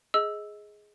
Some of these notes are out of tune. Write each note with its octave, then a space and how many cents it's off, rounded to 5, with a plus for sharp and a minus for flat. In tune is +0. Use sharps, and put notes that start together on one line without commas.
G#4 +5 D#5 +20 E6 +0